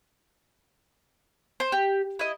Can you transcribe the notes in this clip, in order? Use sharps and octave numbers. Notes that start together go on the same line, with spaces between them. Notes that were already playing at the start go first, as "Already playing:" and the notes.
C5
G4
E4 D#5